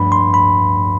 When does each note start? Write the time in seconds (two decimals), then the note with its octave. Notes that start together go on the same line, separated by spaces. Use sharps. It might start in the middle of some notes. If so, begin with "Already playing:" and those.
Already playing: G2 F3 A3 D4 B5
0.12 C6
0.34 B5